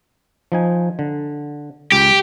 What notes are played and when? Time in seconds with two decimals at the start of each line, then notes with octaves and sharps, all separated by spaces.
0.52 F3 D#4 G#5
0.99 D3
1.92 C#2 G4